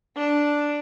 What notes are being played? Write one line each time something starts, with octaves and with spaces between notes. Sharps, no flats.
D4